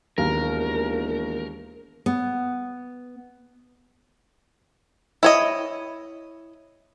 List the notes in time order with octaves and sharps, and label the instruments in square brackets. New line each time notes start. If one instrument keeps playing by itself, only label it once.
[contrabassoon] E1 [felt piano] D#2 [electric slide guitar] A#4
[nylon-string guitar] B3
[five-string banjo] E4 C#5 D#5